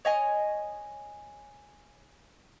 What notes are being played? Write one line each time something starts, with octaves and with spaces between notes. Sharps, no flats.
C#5 D#5 G#5